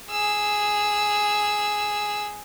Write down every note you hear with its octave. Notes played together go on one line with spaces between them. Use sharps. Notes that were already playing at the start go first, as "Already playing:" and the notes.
G#4 E6